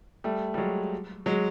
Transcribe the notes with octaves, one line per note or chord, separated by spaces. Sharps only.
G3 A3
G3
F#3 G#3
F#3 G#3